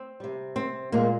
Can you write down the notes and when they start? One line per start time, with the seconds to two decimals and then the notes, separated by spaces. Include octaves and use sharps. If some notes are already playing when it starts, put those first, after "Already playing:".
Already playing: C4
0.20 C3 G3
0.56 C4
0.92 A#2 G#3 A#3